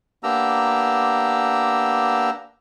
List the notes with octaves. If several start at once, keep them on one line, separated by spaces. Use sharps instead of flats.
A#3 B3 D4 G4 A#5 E6